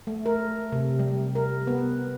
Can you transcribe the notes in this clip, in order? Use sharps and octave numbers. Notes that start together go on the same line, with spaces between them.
A3
A#4
C3
G3
A#4
B3